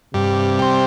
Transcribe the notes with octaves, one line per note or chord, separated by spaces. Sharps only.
G2 C3
G3 C4